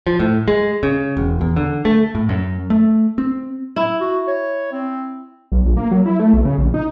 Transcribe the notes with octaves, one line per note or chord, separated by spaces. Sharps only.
F3
A2
G#3
C#3
E1
E2
D3
A3
A2
F#2
A3
C4
E4
F#4
C#5
C4
B1
A#1
A#3
F#3
E4
A3
B1
C#3
A#1
D#4